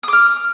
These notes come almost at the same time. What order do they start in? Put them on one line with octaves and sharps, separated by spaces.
D#6 D6 F6